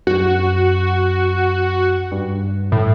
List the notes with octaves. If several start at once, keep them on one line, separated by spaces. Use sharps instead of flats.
F#2 F#4
G2
A2